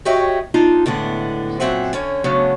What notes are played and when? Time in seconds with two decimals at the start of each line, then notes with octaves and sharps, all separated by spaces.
0.05 F#4 G4 C#5 D#5 E5 G5
0.54 D4 D#4 F4
0.86 A2 D3 G#3 B3
1.60 A#2 F#3 C4 E5 F#5 G#5
1.93 D3 C#4 C#5
2.24 C#3 F#3 A3 B3 C#4 D4